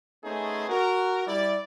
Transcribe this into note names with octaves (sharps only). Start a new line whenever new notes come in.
A3 B3 C#4 D#4 G#4 C5
F#4 A#4
G3 E4 D5